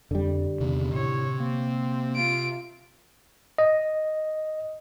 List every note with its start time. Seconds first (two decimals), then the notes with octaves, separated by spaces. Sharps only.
0.11 F2 D3 G3
0.61 E2 C3 D#3
0.94 A2 C3 C#5
1.40 A#3 C4
2.16 F4 D7
3.58 D#5